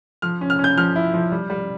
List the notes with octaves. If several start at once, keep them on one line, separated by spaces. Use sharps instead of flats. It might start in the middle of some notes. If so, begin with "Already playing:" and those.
F3 F6
C#4
F6
C#4
G6
F3 F6
E4
F3
G3
G3